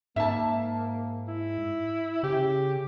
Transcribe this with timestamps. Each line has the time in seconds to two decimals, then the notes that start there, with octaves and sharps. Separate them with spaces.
0.16 G#2 A#3 E5 A5
1.28 E4
2.23 C#3 G4